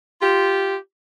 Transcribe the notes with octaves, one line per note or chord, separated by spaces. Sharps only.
F4 G4